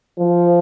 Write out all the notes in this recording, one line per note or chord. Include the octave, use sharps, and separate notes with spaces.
F3